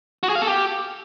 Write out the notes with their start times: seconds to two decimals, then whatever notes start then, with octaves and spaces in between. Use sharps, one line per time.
0.23 F#4
0.29 G#4
0.35 F5
0.41 A4
0.47 G4